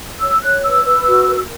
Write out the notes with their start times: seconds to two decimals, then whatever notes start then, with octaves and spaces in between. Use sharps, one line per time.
0.22 C#5 E6
0.42 C#5 F#6
0.63 B4 E6
0.85 B4
1.06 F#4
1.27 A#4